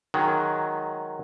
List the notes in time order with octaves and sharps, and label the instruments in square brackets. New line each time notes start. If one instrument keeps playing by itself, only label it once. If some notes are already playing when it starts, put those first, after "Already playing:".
[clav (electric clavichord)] D#3 F#3 G#3